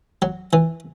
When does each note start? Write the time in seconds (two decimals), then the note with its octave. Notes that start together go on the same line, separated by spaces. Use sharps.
0.22 F#3
0.53 E3